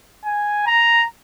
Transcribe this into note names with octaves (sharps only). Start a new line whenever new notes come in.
G#5
A#5